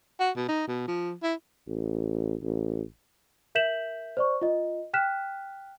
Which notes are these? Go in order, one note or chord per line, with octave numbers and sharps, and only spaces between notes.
F#4
B2
D#4
B2
F3
E4
A1
A1
A#4 E5 G6 B6 E7 F#7
C5 D5 C#6
F4 D#5
G5 F6 F#6 B6 E7